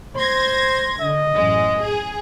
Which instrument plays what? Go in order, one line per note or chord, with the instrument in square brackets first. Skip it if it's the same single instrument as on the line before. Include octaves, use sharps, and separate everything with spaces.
[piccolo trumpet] C5 [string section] C6 G#6 A#6
[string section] D3 [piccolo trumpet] D#5
[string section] A1 F#2 G#3
G#4